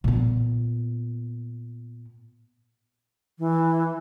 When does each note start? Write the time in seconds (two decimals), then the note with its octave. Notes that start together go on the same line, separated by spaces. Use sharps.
0.04 A#2 B3
3.39 E3